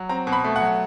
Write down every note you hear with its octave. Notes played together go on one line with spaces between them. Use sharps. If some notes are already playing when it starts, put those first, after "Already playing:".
Already playing: F#3
C4 A#5
B2
B5
A3
F#5
F#3